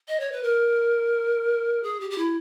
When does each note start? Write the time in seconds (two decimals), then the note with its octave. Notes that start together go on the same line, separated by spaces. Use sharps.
0.08 D#5
0.20 C#5
0.32 B4
0.43 A#4
1.83 G#4
2.00 G4
2.10 G4
2.18 E4